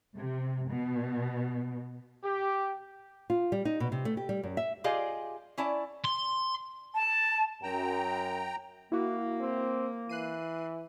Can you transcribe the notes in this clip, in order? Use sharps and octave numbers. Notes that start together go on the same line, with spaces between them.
C3
B2
G4
F4
G3
D#4
B2
C3
A3
G4
G3
F#2
E5
F4 G4 G#4 D5 D#5 F5
C#4 E4 D5 A5
C6
A5
F#2 G5 A#5
A#3 E4 F#4
C4
E3 F#6 C7 D#7